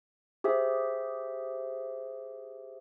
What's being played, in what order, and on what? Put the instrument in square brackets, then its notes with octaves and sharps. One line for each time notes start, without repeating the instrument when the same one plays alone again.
[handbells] G4 G#4 C5 E5